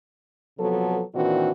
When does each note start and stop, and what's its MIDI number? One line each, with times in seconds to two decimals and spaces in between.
0.58 1.01 48
0.58 1.01 53
0.58 1.01 54
0.58 1.01 59
0.58 1.01 69
1.14 1.50 46
1.14 1.50 51
1.14 1.50 52
1.14 1.50 60
1.14 1.50 62
1.14 1.50 66